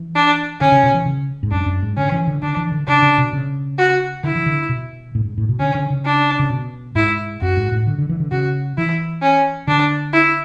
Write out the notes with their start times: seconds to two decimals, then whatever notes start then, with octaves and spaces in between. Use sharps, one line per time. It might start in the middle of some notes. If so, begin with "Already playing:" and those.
Already playing: E3
0.15 D4
0.61 D3 C#4
0.72 C#3
0.83 B2
0.94 E3
1.06 C#3
1.43 G#2
1.51 F#2 D4
1.66 F#2
1.82 G#2
1.97 D3 C#4
2.12 E3
2.27 D3
2.42 D3 D4
2.57 E3
2.72 D3
2.87 C#3 D4
3.02 C#3
3.18 B2
3.33 C#3
3.78 F#4
4.24 D3 E4
4.36 E3
4.46 D3
4.69 B2
5.15 A2
5.25 G#2
5.38 A2
5.49 B2
5.59 D3 C#4
5.75 D3
5.90 C#3
6.05 D4
6.39 C#3
6.50 B2
6.95 G#2 E4
7.42 F#2 F#4
7.57 G#2
7.72 A2
7.87 D3
7.98 D3
8.09 E3
8.20 D3
8.32 C#3 F#4
8.77 E3 E4
9.22 C#4
9.67 D3 D4
10.13 E4